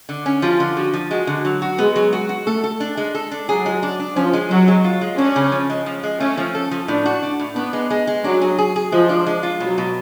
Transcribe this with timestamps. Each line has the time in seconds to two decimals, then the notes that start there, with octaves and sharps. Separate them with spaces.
0.09 D3
0.26 C#4
0.42 F3 F4
0.60 D3
0.77 F3 F#4
0.93 F3
1.10 G#3 F#4
1.27 D3
1.45 F#3
1.62 F#4
1.78 G#3 B3
1.96 F#3
2.13 F#4
2.29 F#4
2.46 A3 A4
2.64 A4
2.80 D4
2.97 G#3
3.15 A4
3.31 D4
3.48 F#3 G#4
3.66 G#3
3.83 D4
3.99 D4
4.16 F3 C#4
4.33 G#3
4.51 F#3 F#4
4.68 G#3
4.84 F4
5.01 G#3
5.18 C#4 D4
5.36 C#3
5.52 F3
5.70 G#3
5.86 F3
6.03 G#3
6.20 A3 C#4
6.37 F3
6.55 A4
6.71 F3
6.88 A2 D4
7.06 F#4
7.23 D4
7.40 A2
7.56 B3 D4
7.73 G#3
7.90 G#3
8.07 G#3
8.24 F#3 D4
8.41 G#4
8.58 G#4
8.76 G#4
8.92 F3 G#3
9.09 D4
9.26 G#3
9.43 F4
9.60 B2 F#3
9.78 B2